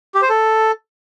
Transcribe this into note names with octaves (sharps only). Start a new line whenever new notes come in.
G4
C5
A4